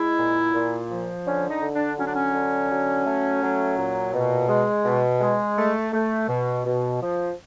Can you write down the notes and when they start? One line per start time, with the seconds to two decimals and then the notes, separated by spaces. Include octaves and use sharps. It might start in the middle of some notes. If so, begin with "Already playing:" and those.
Already playing: G#3 E4
0.18 A#2
0.54 A#2
0.90 F3
1.26 D3 C#4
1.50 D#4
1.62 D3
1.75 D4
1.98 F#3 C#4
2.06 D4
2.14 C#4
2.33 D3
2.70 F#3
3.06 A3
3.42 F#3
3.78 A#2
4.13 B2
4.49 G#3
4.85 B2
5.21 G#3
5.57 A3
5.93 A3
6.28 B2
6.65 B2
7.01 F3